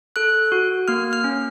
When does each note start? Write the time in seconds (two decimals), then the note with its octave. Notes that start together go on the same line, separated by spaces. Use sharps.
0.16 A4 F#6
0.52 F#4
0.88 A#3 F6
1.13 F6
1.24 C#4